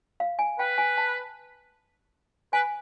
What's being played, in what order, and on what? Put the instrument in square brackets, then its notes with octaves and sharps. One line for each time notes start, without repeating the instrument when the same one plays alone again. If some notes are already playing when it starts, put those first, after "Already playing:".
[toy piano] F5
G#5
[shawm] B4 [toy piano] G5
[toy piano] G#5
A5
[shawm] B4 [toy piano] G#5